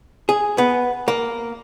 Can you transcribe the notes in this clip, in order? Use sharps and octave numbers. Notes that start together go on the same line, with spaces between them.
G#4
B3
A#3